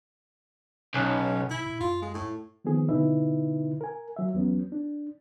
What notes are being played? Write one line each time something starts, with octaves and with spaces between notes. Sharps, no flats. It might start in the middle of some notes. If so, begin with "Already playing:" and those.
B1 C#4
B2 E4
A#2
F#2 F4
G#3
A2
D#3 F3 B3 C4 G#4
B2 D3 D#4 E4 B4 E5
A#4 G#5
F#3 E5
E2 F#3 B3 C#4
D4